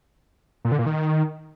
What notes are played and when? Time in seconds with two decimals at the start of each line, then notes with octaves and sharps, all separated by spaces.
0.65 A#2
0.72 D3
0.79 A#2
0.86 D#3